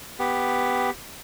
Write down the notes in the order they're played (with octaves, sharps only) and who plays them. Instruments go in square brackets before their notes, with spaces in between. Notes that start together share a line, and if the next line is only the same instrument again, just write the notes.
[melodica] B3 G4